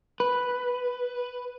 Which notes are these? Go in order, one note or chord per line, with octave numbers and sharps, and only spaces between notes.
B4